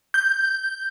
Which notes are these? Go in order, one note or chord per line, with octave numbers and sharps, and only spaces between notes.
G6